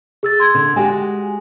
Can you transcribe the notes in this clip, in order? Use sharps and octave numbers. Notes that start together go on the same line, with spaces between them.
G#4 E6 A6
C6 G#6
D3
G#3 F#4 G4 G#5